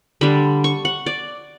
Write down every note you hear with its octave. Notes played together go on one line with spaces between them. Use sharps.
D3 G3 D4 B5
C#6
F#5
D5